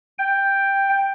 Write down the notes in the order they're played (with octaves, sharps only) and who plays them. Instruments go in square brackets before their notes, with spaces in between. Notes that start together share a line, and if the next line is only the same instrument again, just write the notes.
[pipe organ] G5